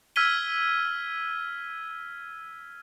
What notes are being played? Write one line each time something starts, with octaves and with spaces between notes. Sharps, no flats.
E6 F6 G#6 B6 D#7 G7